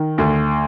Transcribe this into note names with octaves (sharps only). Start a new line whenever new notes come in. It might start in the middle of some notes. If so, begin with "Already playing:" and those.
Already playing: D#3
D2